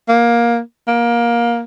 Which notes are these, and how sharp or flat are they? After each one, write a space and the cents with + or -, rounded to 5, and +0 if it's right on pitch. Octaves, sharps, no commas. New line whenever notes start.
A#3 +15
A#3 +20